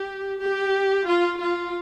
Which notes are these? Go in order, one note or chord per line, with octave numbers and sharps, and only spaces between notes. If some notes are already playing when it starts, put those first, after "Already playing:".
Already playing: G4
G4
F4
F4